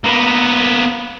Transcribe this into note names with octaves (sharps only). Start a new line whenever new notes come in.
A#3 B3